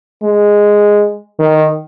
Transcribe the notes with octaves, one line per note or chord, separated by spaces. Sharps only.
G#3
D#3